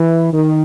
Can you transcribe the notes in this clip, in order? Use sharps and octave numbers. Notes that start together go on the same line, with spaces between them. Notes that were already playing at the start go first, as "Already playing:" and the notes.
Already playing: E3
D#3